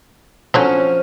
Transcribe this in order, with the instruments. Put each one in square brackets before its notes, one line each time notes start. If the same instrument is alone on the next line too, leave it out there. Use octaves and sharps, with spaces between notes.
[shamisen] D3 F#3 C4 [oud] F3 C#4